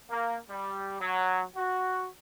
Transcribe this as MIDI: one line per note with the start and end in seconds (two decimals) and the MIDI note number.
0.11 0.37 58
0.50 0.99 55
1.01 1.43 54
1.56 2.06 66